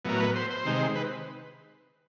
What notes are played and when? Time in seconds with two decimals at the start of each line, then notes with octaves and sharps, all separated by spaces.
0.05 A2 F#3 B3 A#4
0.20 B4
0.36 C5
0.51 C5
0.65 C3 D#3 G#3
0.95 B4